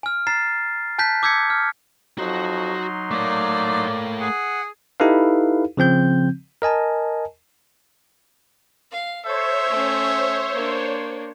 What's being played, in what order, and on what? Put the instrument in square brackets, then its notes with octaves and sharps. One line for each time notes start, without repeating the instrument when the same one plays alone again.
[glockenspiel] G#5 F6
A#5 A6 C7
G#5 A5 F#6 G6 B6
D6 E6 G6 G#6 B6 C#7
F6
[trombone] F2 [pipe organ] F#3 D#4 C6 [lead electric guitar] F#4
[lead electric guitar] A3 C#5 [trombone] A#3 [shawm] D5
[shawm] G#4 [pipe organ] F#5
[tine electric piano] D#4 E4 G4 A4 B4 F5
C#3 F3 C4 G6
A#4 D#5 G#5 A5
[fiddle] F5
[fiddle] A4 [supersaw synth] C5 C#5 [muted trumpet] E5
[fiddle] A3 C#4
A#3 D4